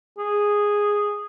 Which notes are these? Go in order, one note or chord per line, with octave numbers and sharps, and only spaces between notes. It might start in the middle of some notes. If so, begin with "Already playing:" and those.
G#4